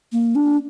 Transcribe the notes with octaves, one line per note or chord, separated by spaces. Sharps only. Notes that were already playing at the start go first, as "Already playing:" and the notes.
A#3
D4